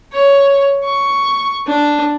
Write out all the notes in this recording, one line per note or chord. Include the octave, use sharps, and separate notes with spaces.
C#5
C#6
D4